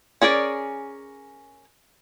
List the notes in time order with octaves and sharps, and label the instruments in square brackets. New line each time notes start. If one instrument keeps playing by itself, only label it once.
[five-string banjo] C#4 G#4 A#4 D5